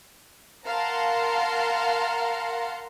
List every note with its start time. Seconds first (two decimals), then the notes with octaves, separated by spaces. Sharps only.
0.67 A#4 F5 F#5 A5 A#5 C6